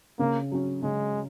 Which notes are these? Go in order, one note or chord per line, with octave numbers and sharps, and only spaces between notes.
C#3 A#3
F#3 C#4
C#3 G#3